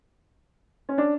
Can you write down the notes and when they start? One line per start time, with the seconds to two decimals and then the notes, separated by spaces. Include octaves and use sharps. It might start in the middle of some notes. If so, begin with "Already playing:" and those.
0.89 C#4
0.98 D4